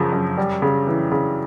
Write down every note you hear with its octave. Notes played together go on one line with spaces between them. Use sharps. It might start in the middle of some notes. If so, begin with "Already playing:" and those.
Already playing: F#2 C#3 F3
F#2
G3
C#3
E3
C#3